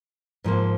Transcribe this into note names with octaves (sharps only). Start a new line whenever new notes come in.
G#2 F3 A#3